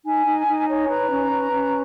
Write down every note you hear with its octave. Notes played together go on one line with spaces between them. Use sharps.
D#4 G#5
D#4
D#4
C#5
B4 A#5
C#4
B4
C#4